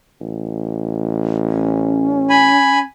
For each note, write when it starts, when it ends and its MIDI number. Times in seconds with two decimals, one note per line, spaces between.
0.21 2.50 33
1.49 2.82 61
2.30 2.79 80
2.30 2.79 83